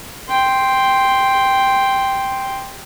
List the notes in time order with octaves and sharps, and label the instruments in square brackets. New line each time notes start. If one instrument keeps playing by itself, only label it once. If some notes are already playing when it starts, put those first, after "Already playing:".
[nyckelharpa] G5 C6